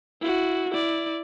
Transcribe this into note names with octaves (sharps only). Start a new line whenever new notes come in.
E4 F#4
E4 D5